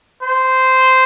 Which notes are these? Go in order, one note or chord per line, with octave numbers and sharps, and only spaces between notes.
C5